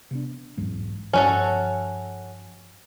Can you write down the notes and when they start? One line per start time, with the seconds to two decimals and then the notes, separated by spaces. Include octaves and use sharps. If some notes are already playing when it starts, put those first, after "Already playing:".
0.11 C3 B3 D4
0.57 B1 E2 G#2
1.13 G1 G2 F3 C#4 F#4 A4